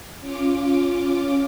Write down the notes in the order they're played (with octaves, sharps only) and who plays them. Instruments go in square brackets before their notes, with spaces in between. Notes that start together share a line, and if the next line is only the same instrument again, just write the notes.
[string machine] C#4 F4 D6